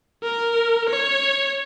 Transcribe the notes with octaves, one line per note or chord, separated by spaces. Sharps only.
A#4
C#5